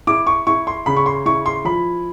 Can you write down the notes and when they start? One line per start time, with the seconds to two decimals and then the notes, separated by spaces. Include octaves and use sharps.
0.07 E4 D6
0.27 C#6
0.47 E4 C#6
0.67 C6
0.86 C#3 B5
0.96 C#6
1.06 C6
1.26 E4 C#6
1.46 C6
1.65 F3 B5